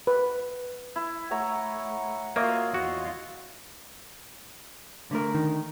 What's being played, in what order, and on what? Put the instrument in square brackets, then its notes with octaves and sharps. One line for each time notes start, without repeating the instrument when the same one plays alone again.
[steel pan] B4
[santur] E4
[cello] A3 [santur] C#5 E5 A#5 [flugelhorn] F#5
[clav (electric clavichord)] A#3 [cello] F4 F#4 [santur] C#5 D#5 E5
[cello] E2 F4 [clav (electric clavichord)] F#4
[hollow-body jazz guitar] D3 A3 A#4
[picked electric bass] D#3